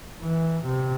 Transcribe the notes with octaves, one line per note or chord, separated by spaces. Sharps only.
E3
C3